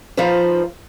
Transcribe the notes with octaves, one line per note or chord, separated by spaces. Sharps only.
F3 D#4 F4 B4 C5